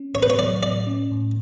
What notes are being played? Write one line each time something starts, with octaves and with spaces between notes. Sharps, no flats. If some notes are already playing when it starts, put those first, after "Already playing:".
Already playing: C#4
A2 C#5
B4
C#5
F#3 D5
A2 D5
C#4
A2